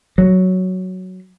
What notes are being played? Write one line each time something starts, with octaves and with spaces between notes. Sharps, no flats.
F#3